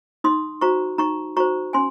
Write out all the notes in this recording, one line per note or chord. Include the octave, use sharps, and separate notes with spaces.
D#4 C6 D#6
F#4 C5 A#5 C#6
D#4 A#5 C#6
F#4 C5 A#5 C#6
C#4 G#5 C6